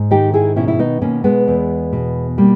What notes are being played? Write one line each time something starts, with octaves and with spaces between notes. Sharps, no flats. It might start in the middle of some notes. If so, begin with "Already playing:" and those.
Already playing: G#2
D#3 D#4 G4
E4 G#4
B2 C#4 E4
E4
B3 D#4
B2 A#3 C#4
G#3 B3
E2
B2
G3 A#3